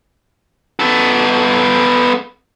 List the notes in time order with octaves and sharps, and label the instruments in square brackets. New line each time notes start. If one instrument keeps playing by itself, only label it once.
[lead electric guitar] B3 A4